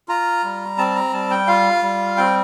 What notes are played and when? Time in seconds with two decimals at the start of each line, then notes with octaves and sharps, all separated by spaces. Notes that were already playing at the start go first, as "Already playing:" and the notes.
0.08 F4 A#5
0.44 G3
0.78 C4 A5
0.95 A#5
1.13 G3 A5
1.30 G5
1.47 F4 F5
1.83 G3
2.17 C4 G5